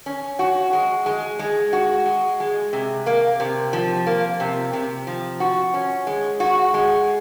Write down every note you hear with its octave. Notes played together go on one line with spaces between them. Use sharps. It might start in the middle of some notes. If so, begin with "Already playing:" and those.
C#4
F#4
G#3
G#3
G#3
F#4
G#3
G#3
C3
A#3
C3
F3
A#3
C3
C3
F3
F#4
C#4
G#3
F#4
G#3